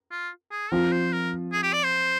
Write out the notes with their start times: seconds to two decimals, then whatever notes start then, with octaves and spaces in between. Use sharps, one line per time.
0.11 F4
0.51 G#4
0.72 F3 C4 F4 A#4
0.92 C5
1.13 A#4
1.53 G#4
1.63 G4
1.73 D5
1.84 C5